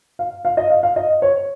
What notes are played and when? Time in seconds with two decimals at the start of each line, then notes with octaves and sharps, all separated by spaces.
0.19 F5
0.45 F5
0.57 D#5
0.70 F5
0.83 F5
0.96 D#5
1.22 C#5